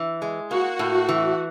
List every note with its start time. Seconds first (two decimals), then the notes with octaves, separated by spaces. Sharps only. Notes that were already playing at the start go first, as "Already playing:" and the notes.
Already playing: E3
0.22 G#3
0.51 A#3 F#4
0.79 A2
1.09 E3